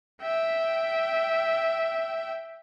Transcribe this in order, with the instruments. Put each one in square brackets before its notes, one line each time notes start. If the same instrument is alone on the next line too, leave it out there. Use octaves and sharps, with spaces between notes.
[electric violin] E5 G5